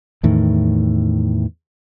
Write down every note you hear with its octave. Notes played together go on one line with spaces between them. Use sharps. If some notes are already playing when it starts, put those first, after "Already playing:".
E2 A2 D#3